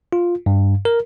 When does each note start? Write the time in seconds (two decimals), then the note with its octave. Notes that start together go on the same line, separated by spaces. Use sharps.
0.13 F4
0.46 G2
0.85 A#4